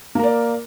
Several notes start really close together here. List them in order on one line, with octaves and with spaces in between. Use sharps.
A#3 A#4 D5